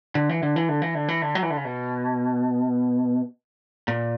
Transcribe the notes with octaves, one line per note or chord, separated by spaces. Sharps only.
D3
E3
D3
E3
D3
E3
D3
E3
D3
F#3
E3
D3
C#3
B2
A#2